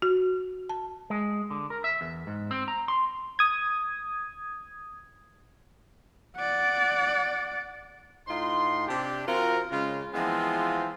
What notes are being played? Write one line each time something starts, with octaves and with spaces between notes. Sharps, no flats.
F#4
A5
G#3
D3
A#4
E5
E2
G#2
C4
A#5
C6
D#6 G#6
D5 F#5
A2 D#4 F4 C6
C3 D4 G4
F3 C4 F4 F#4 A#4
C#3 G#3 F4
E3 F3 G#3 B3 C4 F4